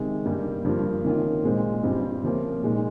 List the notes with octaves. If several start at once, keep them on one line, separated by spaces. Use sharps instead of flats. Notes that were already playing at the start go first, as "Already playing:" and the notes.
Already playing: C3 D#3 G#3
G2 G3 A#3
G2 F3 A#3 F4
C3 D#3 A#3 C#4 F4
A#2 G#3 C4 F4
G2 G3 C4 F4
C3 F3 A#3 C#4 F4
A#2 G#3 D#4